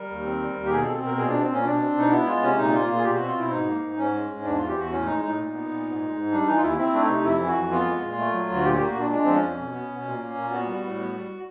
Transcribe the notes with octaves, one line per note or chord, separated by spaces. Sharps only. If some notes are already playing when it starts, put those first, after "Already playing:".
Already playing: G3 A#4
D#2
C4
G3
D#2
G4
B2 G#4
C4 A4
B2 A#4
A#2 G#4
C4 D4
C4
A#2 C#4
B2 D4
C4
B2 D#4
B3 E4
G#3 F4
C3 C#4
A#2 D#4
A#3 F4
A#2 F4
G#4
B2 G4
C4 F#4
F4
B2 E4
G#2 D#4
A#3
G#2
G#2 C#4
G#3
G#2
E2 D4
E3 F4
G4
E2 F#4
A2 C#4
G#3 D#4
A2 D#4
A#2
B3
A#2
G#2
G#3
G#2
G3 D4
E3 D#4
F4
D#2 E4
C4 E4
A3 D4
D#4
C3
F2 E4
E3
F#4
F2
B3 F4
G#3
A#2
A3
F#3
D2
F#4
A#2 G4
A#3 G4
F#4
A#2 D4
G#3 D4
F3 C4
C#4
F2
B2
B3
B2
A#2
A#3
A#2
B3 F#4
G3
A2
B3
G3